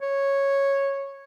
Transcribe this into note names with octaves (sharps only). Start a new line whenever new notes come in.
C#5